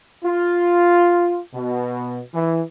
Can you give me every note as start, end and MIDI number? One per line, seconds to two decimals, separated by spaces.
0.25 1.38 65
1.53 2.19 47
2.33 2.60 52